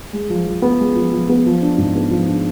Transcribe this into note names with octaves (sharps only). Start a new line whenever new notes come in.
G#3
F3
F3
B3
G#3
F3
F3
B3
F3
D4
G#2
B3
F3
D4